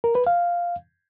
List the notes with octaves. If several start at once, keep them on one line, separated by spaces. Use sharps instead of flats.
A#4
B4
F5